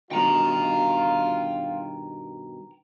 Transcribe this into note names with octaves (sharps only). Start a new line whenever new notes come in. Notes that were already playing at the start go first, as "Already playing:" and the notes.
G2 B2 D#3 F4 G5 A#5